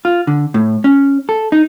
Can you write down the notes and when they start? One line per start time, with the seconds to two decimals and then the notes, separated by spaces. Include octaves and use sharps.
0.05 F4
0.27 D3
0.54 A2
0.84 C#4
1.29 A4
1.52 D#4